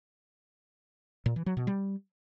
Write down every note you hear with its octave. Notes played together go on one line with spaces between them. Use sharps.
A#2
E3
F#3
B2
G3